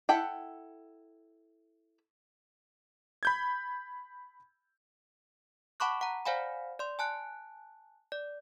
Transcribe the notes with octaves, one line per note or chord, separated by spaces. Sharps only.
E4 A4 F#5 G5
B5 G6 G#6
F#5 A5 B5 C#6 D6 F#6
F#5 A#5
C5 D5 F5 F#5 G#5 B5
D5 C6
G#5 A5 F#6
D5